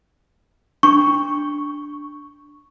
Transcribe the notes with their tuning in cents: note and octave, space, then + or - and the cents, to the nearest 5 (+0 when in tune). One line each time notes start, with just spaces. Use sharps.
D4 +0 C#6 +0